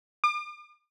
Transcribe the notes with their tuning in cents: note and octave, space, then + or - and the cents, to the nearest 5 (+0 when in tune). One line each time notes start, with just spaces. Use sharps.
D6 +40